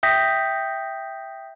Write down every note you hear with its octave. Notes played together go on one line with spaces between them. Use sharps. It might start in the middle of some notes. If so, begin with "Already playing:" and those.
E5 G5 D#6 G6 A#6 B6